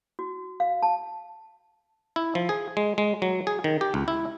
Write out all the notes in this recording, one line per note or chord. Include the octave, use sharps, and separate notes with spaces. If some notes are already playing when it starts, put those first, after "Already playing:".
F#4
F5
A5
E4
F3
G#4
G#3
G#3
F#3
G#4
D#3
G4
C#2
E4